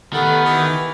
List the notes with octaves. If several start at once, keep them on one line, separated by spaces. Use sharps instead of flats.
D#3 A3 B3 G4 B4 F#5
E3